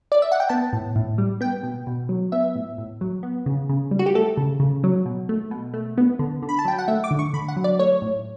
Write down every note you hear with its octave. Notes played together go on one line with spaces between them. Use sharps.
D5
E5
F#5
G5
B3 A5
A2
A2
G3
B3 G5
B2
B2
F#3
B3 E5
A2
A2
F#3
B3
C#3
C#3
G3
F#4
G4
A3 A4
C#3
C#3
F#3
B2
A3
B2
A3
B3
D3
D3
B5
A5
F#3 G5
F#5
A3 E5
D6
D3
C#6
D3 B5
F#5
F#3
D5
A3 C#5
A2